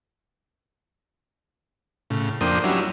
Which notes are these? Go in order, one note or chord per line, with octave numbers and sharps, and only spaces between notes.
A2 C#3
F2 A#3 D4 C5 G5 D#6
F#3 G3 C#4 D4 E4